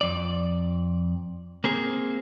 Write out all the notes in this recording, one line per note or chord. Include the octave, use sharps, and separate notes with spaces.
F2 D5
A#3 C4 G#4